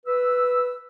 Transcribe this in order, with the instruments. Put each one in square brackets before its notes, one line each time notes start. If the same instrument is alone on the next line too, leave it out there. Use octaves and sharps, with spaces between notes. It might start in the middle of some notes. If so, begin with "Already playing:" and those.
[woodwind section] B4 E6